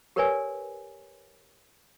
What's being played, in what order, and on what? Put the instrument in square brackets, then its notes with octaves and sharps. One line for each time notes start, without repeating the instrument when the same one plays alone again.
[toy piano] G4 A#4 B4 C#5 D5 G#5